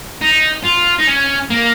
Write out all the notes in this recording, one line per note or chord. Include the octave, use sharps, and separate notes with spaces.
D#4
F4
D#4
C#4
A#3